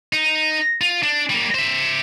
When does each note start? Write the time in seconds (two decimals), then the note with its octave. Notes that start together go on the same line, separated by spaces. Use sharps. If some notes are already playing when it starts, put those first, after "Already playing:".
0.13 D#4
0.81 F4
1.03 D4
1.30 G3 A#3
1.54 C5 E5